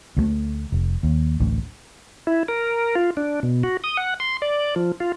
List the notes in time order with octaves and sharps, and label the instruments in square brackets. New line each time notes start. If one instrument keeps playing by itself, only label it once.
[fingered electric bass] D2 G3 A3
F1
D#2
A1 D2
[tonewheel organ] E4
A#4
F4
D4
B2
F#4
D#6
F#5
C6
D5
F3
F4